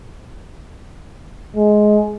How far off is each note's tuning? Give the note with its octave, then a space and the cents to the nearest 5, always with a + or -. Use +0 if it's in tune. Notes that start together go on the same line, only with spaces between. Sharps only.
G#3 +15